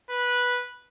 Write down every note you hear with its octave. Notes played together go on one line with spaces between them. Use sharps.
B4